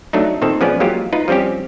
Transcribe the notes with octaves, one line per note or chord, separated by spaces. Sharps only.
F#3 A3 D4 D#4
A#2 D#3 C4 A4
F3 G#3 B3 C#4 B4 D5
F#3 G#3 A#3 F4 G4
D#4 F4 B4
F3 G3 C4 C#4 G4